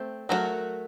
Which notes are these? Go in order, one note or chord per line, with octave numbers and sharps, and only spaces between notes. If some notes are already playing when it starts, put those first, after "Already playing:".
Already playing: A3 C4
F#3 A3 C4 F#4 A#4